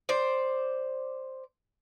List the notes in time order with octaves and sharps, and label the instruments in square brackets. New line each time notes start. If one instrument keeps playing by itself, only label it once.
[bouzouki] C5 D5